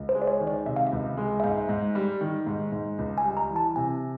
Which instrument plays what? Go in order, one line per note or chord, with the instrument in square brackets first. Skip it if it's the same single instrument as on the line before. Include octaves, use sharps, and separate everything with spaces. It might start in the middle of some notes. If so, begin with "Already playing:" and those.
Already playing: [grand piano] C#2
[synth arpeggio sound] C5
[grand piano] G#3
[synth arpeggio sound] D5
C#5
[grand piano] D#3
[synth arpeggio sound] D5
[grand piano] C3 [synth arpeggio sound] E5
[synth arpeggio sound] F5
E5
[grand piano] C#2
G#3
[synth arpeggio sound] E5
[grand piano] G#2 [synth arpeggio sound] F5
[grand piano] G#2
G3
D#3
G#2
G#2
C#2
[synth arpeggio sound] G#5
[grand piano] G3
[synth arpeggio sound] A#5
[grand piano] E3
[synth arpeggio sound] A5
[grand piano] C3 [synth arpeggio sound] G#5